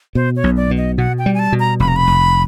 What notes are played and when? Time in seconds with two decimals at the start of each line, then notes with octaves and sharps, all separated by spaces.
0.15 B2 C5
0.36 C#5
0.44 B1
0.57 D5
0.71 B2
0.77 D#5
0.98 B2 F#5
1.18 G5
1.26 G3
1.34 G#5
1.39 A5
1.52 B2
1.60 A#5
1.80 F1 B5
1.88 A#5
1.96 B5
2.07 F1